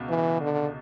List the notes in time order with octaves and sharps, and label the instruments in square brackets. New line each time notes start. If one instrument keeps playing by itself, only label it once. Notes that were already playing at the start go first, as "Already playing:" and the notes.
Already playing: [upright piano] C#2 B2
[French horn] E3
D3